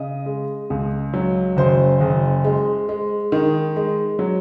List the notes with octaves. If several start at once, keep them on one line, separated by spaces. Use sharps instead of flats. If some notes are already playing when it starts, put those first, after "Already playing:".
Already playing: C#3 D#5
G#3
C#2
F#3
F#1 C5
F#1
G#3
G#3
D#3
G#3
F#3